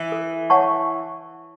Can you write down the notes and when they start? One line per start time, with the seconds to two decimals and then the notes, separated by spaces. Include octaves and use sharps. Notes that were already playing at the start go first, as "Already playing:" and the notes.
Already playing: E3
0.12 A4
0.50 C#5 F#5 A5 C#6